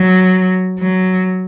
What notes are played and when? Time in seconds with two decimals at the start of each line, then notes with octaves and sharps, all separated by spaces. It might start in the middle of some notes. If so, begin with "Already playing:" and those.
Already playing: F#3
0.79 F#3